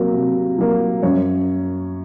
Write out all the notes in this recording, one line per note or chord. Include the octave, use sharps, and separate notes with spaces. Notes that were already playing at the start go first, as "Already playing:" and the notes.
Already playing: C3 F#3 A#3
C3
F#3 A#3
F#2 C#5